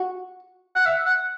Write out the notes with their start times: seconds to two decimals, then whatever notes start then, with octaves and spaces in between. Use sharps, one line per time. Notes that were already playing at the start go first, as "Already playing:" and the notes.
Already playing: F#4
0.76 F#5
0.86 E5
1.06 F#5